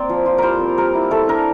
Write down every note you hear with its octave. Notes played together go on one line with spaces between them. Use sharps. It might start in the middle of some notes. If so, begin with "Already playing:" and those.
Already playing: A#3 C4 D5
F3
F4
G3 A#4 C5
C4
G3 A#4
E4
A3 A4
D4 A#4